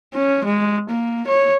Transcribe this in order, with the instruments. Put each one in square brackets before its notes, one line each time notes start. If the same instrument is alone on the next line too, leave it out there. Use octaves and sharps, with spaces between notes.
[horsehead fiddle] C#4
G#3
A#3
C#5